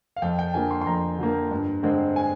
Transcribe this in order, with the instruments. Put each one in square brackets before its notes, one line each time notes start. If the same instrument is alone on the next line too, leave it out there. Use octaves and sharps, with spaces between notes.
[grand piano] F5
F2 G5
G5
D3 F3 A#3 G#5
C6
C6
F2 A#5
D3 F3 A#3
G2
D3 G#3 C4
G#5